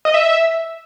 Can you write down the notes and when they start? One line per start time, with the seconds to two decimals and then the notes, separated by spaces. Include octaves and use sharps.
0.05 D#5
0.14 E5